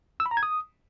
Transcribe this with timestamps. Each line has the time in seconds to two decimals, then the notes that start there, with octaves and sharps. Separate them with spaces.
0.20 E6
0.26 B5
0.31 A#5
0.37 G#6
0.43 D#6